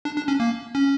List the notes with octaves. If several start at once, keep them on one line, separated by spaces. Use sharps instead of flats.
D4
D4
C#4
A#3
C#4